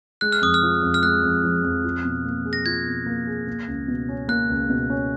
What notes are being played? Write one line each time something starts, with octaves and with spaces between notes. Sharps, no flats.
G#3 F#6
F6
F2 D#6
F6
F3
F2
F6
G#3 F#6
F2
F3
F2
F4
B2
A#3
G#4
A#6
F4 G#6
B2
A#3
G#4
A#3
C#2
B2
C#4
A#3 F#6
C#2
B2
C#4